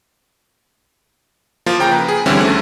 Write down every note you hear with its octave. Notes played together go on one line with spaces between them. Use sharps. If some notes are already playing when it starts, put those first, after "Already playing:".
F3 A#3 F4
C#3 G5 A#5
B4
G#4
D3 E3 G3 C4 C#4 E4
D2 A3